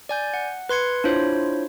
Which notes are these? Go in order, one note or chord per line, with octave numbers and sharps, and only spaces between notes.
D5 G#5 G6
F#5
B4 C6 G#6 C#7
D4 E4 F4 C5 C#5